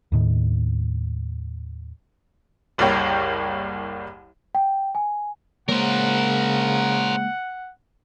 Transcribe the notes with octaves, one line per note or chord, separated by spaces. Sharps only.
D#2 A2 D#3
F#1 C2 G3 A#3 C#5 G5
G5
G#5
C#3 G#3 A#3 A#4 C5 C#5 F#5